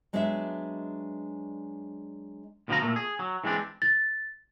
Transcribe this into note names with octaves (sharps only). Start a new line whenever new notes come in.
F#3 G#3 B3 D4 F#4 E5
D2 B2 F3 F#3 F4 A#5
A#2 A3
G#4
F#3
E3 G#3 C4 D4
A6